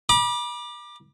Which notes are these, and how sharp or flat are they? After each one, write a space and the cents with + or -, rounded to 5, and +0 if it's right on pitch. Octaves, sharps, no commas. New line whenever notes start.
B5 -35 D6 +20